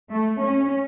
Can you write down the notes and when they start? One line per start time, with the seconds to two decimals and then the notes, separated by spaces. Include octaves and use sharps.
0.12 A3
0.44 C#4